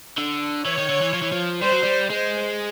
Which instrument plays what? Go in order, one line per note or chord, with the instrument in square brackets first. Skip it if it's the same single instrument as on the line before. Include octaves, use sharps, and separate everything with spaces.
[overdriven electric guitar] D3
[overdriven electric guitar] E3 [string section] C#5
[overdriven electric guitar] D#3
D3
E3
F3
E3
F3
[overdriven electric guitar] G3 [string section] C5
[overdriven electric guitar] F#3
G3
[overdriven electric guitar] G#3 [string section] C5